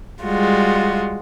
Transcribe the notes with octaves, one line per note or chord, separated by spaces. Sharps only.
G3 G#3 F4 F#4